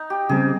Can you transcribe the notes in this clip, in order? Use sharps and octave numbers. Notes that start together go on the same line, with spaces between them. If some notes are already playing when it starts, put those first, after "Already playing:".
Already playing: D#4
G4
C#3 G3 C4 G#4